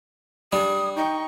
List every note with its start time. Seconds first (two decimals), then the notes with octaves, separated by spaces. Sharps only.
0.53 G3 D4 D#6
0.96 D#4 G5 C#6